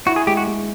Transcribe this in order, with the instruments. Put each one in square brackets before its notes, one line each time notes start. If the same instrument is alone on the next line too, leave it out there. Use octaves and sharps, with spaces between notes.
[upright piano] E4 [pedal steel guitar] F#4
[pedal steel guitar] G#4
[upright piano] G#3 [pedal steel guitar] G4
[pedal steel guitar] F#4
[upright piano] G#3